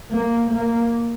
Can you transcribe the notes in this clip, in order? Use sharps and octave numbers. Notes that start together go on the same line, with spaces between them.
A#3
A#3